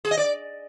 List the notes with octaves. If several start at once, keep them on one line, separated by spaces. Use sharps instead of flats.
G#4
D#5
D5